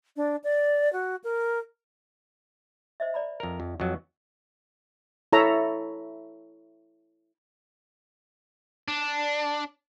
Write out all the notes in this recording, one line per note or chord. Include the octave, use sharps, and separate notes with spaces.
D4
D5
F#4
A#4
C5 D#5 E5
D5 A#5 B5
F2 A#4
F2
F2 F#3 B4 D#5 C#6
E4 A4 C#5 E5 A#5
D4